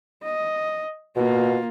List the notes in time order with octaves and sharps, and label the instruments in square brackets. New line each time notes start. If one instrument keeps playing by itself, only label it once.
[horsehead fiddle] D#5
[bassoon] B2 [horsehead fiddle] A#3 F4